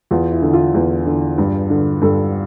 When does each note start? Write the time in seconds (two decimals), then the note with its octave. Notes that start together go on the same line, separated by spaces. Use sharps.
0.11 E2 F4
0.32 E4
0.42 D3
0.53 F4
0.74 E2
1.06 D3
1.38 G2
1.70 D3
2.02 G2 A4